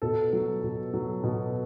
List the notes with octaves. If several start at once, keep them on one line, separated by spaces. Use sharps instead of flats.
B2 A4
F#3
B2
F#3
B2